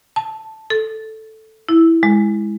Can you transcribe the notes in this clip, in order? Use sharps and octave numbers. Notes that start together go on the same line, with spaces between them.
A5
A4
E4
G#3